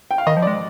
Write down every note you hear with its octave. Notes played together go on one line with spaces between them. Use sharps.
G5
F5
D#3 D#5
F3
D5
G#3